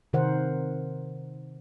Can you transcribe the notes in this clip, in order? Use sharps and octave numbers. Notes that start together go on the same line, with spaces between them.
C3 D#3 A#4 C5 F#5